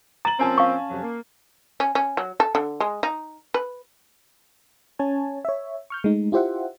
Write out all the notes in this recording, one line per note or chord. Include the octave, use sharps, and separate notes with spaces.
A#5 A6 F#7
F3 A#3 C4 C#4 G#5 A5
F5 C#6
F2 C3 F#3
A#3
C#4
C#4
F#3
A4
D3
G#3
D#4
B4
C#4 C#5 G#5 A5
C#5 E5
C#6 F6 G6
G#3 A3 D#4
E4 F4 G4 C5 E5 F#5